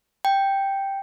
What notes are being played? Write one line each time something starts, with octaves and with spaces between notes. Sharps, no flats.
G5